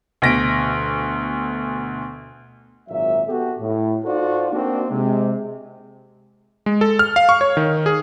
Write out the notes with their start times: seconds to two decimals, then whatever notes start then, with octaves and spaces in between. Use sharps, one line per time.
0.22 D2 B2 A#6 B6 D7
2.88 G#1 A#2 F#3 E5
3.26 B3 F#4 G4 A4
3.59 A2
4.05 D#4 F4 F#4 A4 C5 D5
4.52 A#3 C4 D4 D#4 F#4
4.89 C3 G#3
6.66 G#3
6.81 A4
6.99 F6
7.16 F5
7.29 C#6
7.41 C#5
7.57 D#3
7.86 G#4